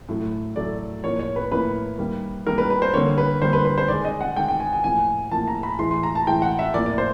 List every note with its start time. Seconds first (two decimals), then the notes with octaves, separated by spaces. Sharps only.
0.09 A2 F#3 A3
0.56 A2 F#3 A3 D5
1.04 A2 F3 A#3 C#5
1.19 C#5
1.36 B4
1.51 A2 F3 A#3 B4
1.98 D#3 G3 A#3
2.46 D#3 G3 A#3 A#4
2.58 B4
2.70 B4
2.82 C5
2.94 D3 G3 A#3 C#5
3.18 B4
3.42 D3 G3 A#3 C5
3.53 B4
3.65 B4
3.78 C5
3.88 D#3 G#3 D5
4.05 D#5
4.21 F#5
4.36 D#3 G#3 G5
4.48 G5
4.60 G#5
4.73 G#5
4.84 A2 F3 A#3 G#5
5.31 A2 F3 A#3 A5
5.48 A#5
5.63 B5
5.79 A2 E3 G#3 C6
5.91 C6
6.03 A#5
6.15 A5
6.27 A2 E3 G#3 G5
6.42 F#5
6.59 E5
6.74 A2 F3 A#3 D5
6.86 D5
6.98 C5